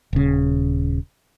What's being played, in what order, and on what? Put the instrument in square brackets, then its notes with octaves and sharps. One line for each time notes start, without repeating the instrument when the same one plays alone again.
[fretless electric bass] D#1 C#3